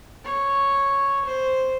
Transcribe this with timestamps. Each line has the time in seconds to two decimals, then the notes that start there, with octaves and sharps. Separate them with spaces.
0.25 C#5
1.25 C5